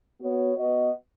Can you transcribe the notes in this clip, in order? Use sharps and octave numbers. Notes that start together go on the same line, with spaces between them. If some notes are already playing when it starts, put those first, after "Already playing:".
B3 F#4 C#5
B3 F#4 B4 D#5